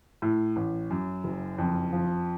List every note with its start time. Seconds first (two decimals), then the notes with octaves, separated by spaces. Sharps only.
0.22 A2
0.56 A1
0.90 F#2
1.24 F#1
1.58 F2
1.93 F3